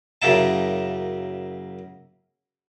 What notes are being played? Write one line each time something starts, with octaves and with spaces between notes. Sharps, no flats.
F#2 C#3 A#3 E4 A5